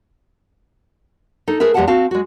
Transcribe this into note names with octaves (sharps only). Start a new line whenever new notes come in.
D#4 A4
A3 G#4 A#4 B4 E5
E2 G#3 G4 F5 F#5 A5
C4 F#4 F5 A5
G#3 F#4